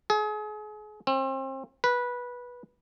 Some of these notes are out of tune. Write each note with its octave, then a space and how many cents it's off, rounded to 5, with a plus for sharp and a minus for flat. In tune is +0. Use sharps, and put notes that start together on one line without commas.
G#4 +35
C4 +35
B4 -15